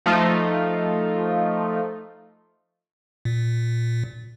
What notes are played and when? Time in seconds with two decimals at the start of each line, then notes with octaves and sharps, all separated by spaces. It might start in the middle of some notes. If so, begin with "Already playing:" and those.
0.06 F3 A3 D#4 F4
3.25 A#2